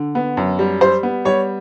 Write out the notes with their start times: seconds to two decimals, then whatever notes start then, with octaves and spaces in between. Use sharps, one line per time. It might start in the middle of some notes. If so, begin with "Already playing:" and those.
Already playing: D3
0.15 B3
0.37 F#2
0.59 G3
0.81 G3 C5
1.03 B3
1.25 G3 C#5